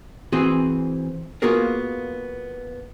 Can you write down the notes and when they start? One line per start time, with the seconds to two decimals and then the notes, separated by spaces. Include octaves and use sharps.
0.32 E3 C4 F#4 G#4 C5
1.42 A#3 B3 F4 F#4 G#4 A#4